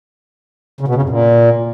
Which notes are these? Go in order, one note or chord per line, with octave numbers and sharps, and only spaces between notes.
C#3
B2
C#3
F#2
A#2